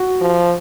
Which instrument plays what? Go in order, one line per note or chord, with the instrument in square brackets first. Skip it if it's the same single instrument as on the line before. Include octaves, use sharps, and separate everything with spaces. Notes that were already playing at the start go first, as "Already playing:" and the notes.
Already playing: [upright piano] F#4
[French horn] F3